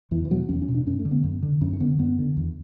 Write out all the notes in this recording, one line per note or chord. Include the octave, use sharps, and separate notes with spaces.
E2 E3
E3
B2 F#3
E2 C#4
C#4
B2
D4
F#2 C#4
A3
D3
B3
F#2
D3
F#2 C#4
C#4
D3 B3
F#2 B3
D3
E2